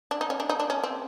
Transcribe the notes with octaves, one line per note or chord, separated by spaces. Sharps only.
D4
D#4
C#4
D4
D#4
D4
C#4
C4